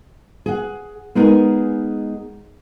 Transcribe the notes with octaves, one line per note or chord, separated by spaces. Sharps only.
G#4 F#5
G#3 B3 D#4 G#4 A#4